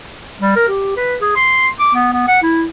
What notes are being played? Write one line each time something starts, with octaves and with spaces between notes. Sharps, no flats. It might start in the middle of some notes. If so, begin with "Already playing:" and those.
G3
A#4
G4
B4
G#4
C6
D6
B3
B3
F#5
E4